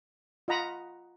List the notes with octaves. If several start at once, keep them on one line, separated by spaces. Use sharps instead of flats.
F4 D#5 F#5 A#5 B5 D#6